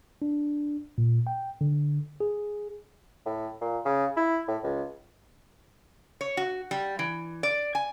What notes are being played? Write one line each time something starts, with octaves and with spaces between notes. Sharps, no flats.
D4
A#2
G5
D3
G#4
A2
A#2
C#3
E4
A2
C#2
C#5
F#4
G3
E3
D5
G#5